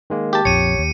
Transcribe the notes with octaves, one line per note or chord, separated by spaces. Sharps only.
D#3 G#3 A#3
G4 A5
A#1 F2 C#5 C#7 D#7
D#2